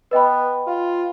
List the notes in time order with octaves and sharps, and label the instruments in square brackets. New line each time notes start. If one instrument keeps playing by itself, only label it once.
[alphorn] B3 [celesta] B4 D#5 G5 B5
[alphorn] F4